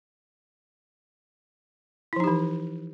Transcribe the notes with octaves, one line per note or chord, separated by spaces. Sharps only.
E3 F3 D#4 E4 G4